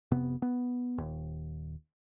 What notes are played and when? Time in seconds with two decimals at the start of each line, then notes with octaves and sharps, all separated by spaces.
0.11 F1 C3 B3
0.42 B3
0.98 D#1 D#2